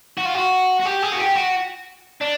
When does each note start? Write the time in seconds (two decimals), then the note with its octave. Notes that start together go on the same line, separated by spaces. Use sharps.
0.17 F#4
0.25 F4
0.35 F#4
0.80 F#4
0.85 G4
1.02 G#4
1.12 F#4
1.19 G4
1.36 F#4
2.21 D4